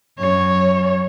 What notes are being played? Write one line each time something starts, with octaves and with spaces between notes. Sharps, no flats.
F#2 C#5